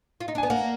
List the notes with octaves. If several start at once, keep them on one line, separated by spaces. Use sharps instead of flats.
F4
D#4
D4
B3 G#5
A#3 F#5